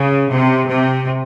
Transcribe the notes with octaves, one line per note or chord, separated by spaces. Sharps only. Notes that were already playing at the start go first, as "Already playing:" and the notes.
Already playing: C#3
C3
C3